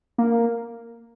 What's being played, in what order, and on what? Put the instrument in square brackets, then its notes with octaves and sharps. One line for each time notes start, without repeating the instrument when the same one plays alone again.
[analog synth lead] A#3